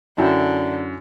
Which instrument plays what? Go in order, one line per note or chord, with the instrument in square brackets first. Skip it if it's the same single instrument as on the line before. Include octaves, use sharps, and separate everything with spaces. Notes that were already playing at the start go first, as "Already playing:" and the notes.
[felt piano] F#2 [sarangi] D3 [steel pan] E4 G5 A5